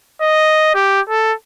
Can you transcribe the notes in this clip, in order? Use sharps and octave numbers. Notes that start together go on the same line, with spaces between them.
D#5
G4
A4